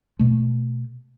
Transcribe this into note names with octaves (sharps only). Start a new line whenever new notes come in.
B2 A3